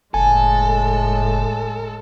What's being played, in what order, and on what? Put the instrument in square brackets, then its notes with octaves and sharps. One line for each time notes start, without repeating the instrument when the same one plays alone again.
[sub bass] F#1 [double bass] A2 G#3 [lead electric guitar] A4 [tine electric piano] G#5